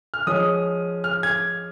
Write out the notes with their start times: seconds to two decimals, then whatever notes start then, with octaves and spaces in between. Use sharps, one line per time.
0.14 F6
0.27 F3 G#3 C#4 D#6
1.04 F6
1.23 G#6